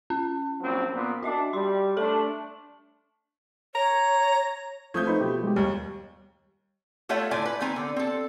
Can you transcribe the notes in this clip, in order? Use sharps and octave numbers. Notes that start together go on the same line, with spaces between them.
C#4
A#1 F#3 C4
A#2 B3
D4 F#4 D#5 E5
G3 C6
A3 D4 A4 F#7
C#5 A#5
F3 A3 C4 F4 D#6 G6 G#6
D#4 B4 C5 B5
B2 F3 G4
G#3 G4
D#2 G3 D#5
A3 F4 A4 C#5 E5 F#5
A2 D3 F4 D5 G#5
B4
D#3 B3 C4 G#5 A#5
D3
C4 A4